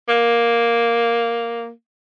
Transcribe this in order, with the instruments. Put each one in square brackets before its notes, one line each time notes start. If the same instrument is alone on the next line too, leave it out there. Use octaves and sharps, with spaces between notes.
[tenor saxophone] A#3